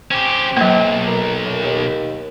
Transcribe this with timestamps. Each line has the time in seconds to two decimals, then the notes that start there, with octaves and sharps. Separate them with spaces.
0.11 C4 C#4 G4
0.57 B1 F#3 A#3
1.07 A#4
1.45 F#2
1.63 D#2